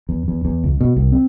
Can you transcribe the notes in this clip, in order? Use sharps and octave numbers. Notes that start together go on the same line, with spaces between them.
E2
E2
E2
C#2
B2
C2
C4